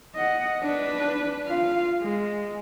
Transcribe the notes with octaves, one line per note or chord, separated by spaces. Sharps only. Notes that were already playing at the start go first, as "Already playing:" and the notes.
D#5 F#5
D4 B4
F4 F5
G#3